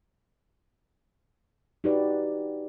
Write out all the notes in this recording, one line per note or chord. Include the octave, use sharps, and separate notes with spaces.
D#4 F#4 G4 B4 D5